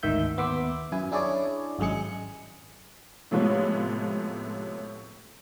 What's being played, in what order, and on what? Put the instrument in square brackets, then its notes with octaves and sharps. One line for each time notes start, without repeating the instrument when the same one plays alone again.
[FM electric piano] G#1 D2 D#3 E5 G6
D#2 B3 E5 C6 D6
F#2 E4 G#5
D4 E4 G#4 C#5 D5
G#1 F#2 G#3 G#4 C#7
[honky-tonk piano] A2 C3 F3 G#3 B3 C#4